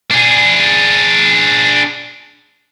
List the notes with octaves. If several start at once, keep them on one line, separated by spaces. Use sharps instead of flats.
D4 G#4